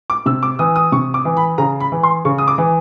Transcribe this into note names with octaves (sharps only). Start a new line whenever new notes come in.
D6
C3 E6
D6
E3 D#6
D#6
C3 C#6
D6
E3
B5
C#3 A#5
B5
E3
C6
C#3 C#6
D#6
D6
E3